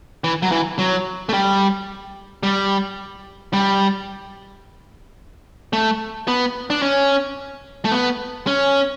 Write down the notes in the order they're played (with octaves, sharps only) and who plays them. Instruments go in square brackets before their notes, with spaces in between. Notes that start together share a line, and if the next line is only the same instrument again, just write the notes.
[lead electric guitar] E3
F#3
E3
F#3
A3
G3
G3
G3
A3
B3
D4
C#4
A3
B3
C#4